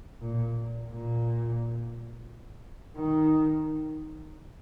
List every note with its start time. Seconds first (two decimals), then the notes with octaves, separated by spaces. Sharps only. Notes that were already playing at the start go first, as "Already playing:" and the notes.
0.21 A#2
0.90 A#2
2.97 D#3